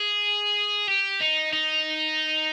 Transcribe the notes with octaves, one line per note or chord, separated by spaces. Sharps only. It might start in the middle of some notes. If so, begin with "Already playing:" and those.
Already playing: G#4
G4
D#4
D#4